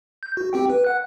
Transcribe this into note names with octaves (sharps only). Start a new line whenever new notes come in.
G6
F#4
C4 G4 G5
B4
F#5 F#6